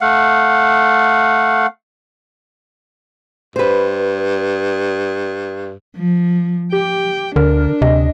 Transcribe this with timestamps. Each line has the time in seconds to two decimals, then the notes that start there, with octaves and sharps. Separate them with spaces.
0.01 A3 F5 F#5
3.56 G2 B4 C5
5.96 F3
6.72 G4 G5
7.36 D2 D3 D4 A#4
7.82 D2 C3 D#5